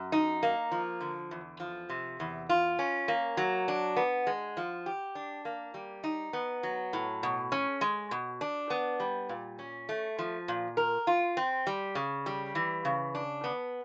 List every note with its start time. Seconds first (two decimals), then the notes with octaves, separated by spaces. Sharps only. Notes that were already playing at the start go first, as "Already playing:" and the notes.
Already playing: F#2
0.12 D#4
0.43 A#3
0.71 F3
1.01 D3
1.31 E2
1.60 F3
1.89 C3
2.20 E2
2.49 F4
2.79 C#4
3.08 A#3
3.37 F#3
3.68 D4
3.96 B3
4.27 G#3
4.57 F3
4.86 G4
5.15 D4
5.45 A#3
5.74 G3
6.04 D#4
6.33 B3
6.63 F#3
6.93 A2
7.23 B2
7.52 C#4
7.81 G#3
8.11 B2
8.41 D4
8.70 B3
9.00 G3
9.29 A#2
9.59 C#4
9.89 A3
10.19 F3
10.48 A#2
10.77 A#4
11.07 F4
11.37 C4
11.67 G3
11.95 C#3
12.26 G3
12.55 E3
12.85 C#3
13.15 D4
13.44 B3